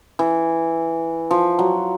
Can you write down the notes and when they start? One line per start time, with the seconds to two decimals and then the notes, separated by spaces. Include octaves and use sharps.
0.19 E3
1.31 F3
1.59 F#3